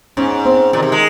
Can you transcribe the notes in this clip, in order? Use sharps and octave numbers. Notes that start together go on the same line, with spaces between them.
G#2 C#4
C4
A#2 D#3
C3
G#3